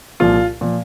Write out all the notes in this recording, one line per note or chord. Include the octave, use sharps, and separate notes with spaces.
C2 A#2 F3 F4
A#2 F3